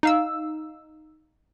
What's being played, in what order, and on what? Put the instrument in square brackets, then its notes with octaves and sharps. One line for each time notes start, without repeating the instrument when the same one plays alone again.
[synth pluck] D#4 F5 E6